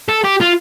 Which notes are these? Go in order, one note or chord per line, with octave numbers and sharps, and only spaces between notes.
A4
G4
F4